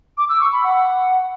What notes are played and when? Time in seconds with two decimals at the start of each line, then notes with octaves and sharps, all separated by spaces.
0.18 D6
0.29 E6
0.41 C#6
0.52 B5
0.64 F#5